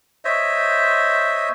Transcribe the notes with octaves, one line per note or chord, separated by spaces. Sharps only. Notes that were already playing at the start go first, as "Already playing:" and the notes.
C5 C#5 D#5 E5